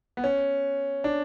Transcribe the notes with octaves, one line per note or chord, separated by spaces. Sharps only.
B3
C#4
D4